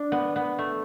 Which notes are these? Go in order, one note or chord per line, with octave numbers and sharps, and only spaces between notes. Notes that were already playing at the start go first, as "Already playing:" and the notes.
Already playing: D4
B3
B3
A3